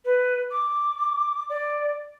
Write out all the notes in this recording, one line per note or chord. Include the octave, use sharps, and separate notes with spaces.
B4
D6
D5